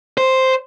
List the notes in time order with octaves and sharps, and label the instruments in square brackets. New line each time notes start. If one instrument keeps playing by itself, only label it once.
[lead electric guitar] C5